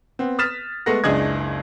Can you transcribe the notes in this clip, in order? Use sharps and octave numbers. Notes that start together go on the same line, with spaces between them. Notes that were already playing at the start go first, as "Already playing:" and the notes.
B3 C4
D#6 F6 A6 B6 E7
G#3 A3 B3 F#5 A#6
F#1 C#2 D4 G#4 D#5 G#6